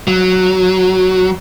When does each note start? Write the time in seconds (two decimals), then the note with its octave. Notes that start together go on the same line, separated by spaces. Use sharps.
0.08 F#3